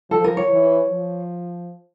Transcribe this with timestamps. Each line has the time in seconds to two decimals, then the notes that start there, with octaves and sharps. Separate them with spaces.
0.10 F3 A4
0.24 A#4
0.37 C#5
0.50 E3
0.89 F3